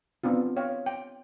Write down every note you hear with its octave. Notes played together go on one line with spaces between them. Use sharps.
B3 C4 D4 F4
C#5 F5 G5
G5